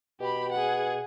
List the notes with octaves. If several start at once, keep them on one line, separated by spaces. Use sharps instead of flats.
B2 G4 B5
G#4 F#5